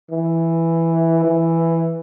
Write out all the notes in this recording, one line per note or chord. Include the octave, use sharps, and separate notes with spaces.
E3
E3